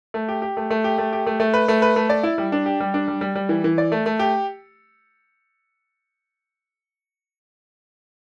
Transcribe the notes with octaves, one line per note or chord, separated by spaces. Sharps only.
A3
G4
G4
A3
A3
G4
A3
G4
A3
A3
B4
A3
B4
A3
D5
E4
G3
D4
G4
G3
D4
G3
G3
G3
E3
E3
D5
A3
A3
G4